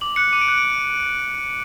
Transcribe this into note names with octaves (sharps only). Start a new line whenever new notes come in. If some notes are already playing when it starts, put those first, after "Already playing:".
D6 F#7
F#6 C#7
D6 D#7
D7
F#6 C#7
D7
D6